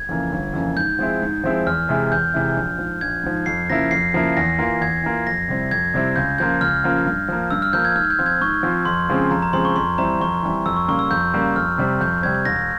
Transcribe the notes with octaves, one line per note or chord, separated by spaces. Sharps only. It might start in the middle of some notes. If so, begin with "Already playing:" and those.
Already playing: G#6
F2 C#3 E3 A#3
G1
F2 C#3 E3 A#3
G#2 G6
F3 G#3 C4 E4
G#2
F3 G#3 C4 E4
E2 F6
C3 E3 G#3 E4
E2 G6
C3 E3 G#3 E4
A#1
G#2 F3
A#1 G#6
G#2 F3
F2 C7
C#3 F3 A#3 E4 A#6
F2 C7
C#3 F3 A#3 E4
E2 A#6
E3 A#3 F4
E2 G#6
E3 A#3 F4
F2 A#6
C3 G3 C4 E4
F2 G#6
C3 G3 C4 E4
C#2 G6
C#3 F3 A#3 F4 G6
C#2 F6
C#3 F3 A#3 F4
G2
F3 A#3
G2 E6
F6
F3 A#3 G6
G#6
G#2 F6
G6
F3 C4 F4
G#6
G#2 C#6
F3 C4 F4
F2 C6
C#3 F3 G#3 C4
F2 A#5
A#5
C#3 F3 G#3 C4 C6
C#6
F2 C6
E3 G3 C4 E4 A#5
F2 C#6
E3 G3 C4 E4
F2 E6
C#6
C#3 G3 A#3 C#6
E6
F2 G6
C#3 G3 A#3
F2 F6
C3 G3 C4
F2 G6
C3 G3 C4 G#6
E1 A#6